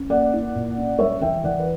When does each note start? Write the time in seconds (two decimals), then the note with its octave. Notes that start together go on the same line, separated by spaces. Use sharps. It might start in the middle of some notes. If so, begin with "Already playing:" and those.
Already playing: C#4
0.10 A#3 D5 F#5
0.33 E4
0.55 A#2
0.77 C#4
0.99 G3 C#5 E5
1.21 E3 E5 G5
1.44 E3 D5 F#5
1.59 B4